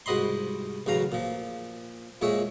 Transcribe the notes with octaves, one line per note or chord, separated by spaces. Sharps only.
C2 G#2 F#4 D#5 B5 C6
A1 C#3 F#3 F5 A#5
A#2 F3
F2 A#2 G#3 C#5 E5